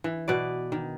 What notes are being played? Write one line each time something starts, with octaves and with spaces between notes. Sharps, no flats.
E3
B2 B4 D5
D#3